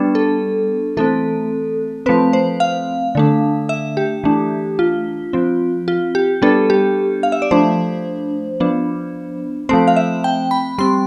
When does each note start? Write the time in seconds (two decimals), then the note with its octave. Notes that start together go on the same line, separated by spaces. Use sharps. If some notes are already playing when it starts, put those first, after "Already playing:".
Already playing: G3 B3 D4
0.15 A4
0.97 E3 A3 C4 A4
2.06 F3 A3 C4 B4
2.33 C5
2.60 F5
3.15 D3 A3 D4
3.69 E5
3.97 G4
4.24 E3 A3 D4
4.79 F4
5.33 F3 C4
5.88 F4
6.15 G4
6.42 G3 B3 D4 A4
6.70 G4
7.23 F5
7.32 E5
7.42 D5
7.51 F3 A3 D4 C5
8.60 F3 B3 D4
9.69 F3 A3 C4 C5
9.88 F5
9.96 E5
10.24 G5
10.51 B5
10.78 G3 C4 C6